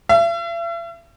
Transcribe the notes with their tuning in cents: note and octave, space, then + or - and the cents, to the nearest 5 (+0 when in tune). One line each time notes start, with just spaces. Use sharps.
E5 +45